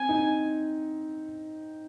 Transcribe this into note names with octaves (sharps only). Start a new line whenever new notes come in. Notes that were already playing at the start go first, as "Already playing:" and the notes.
Already playing: C4 G#5
D#4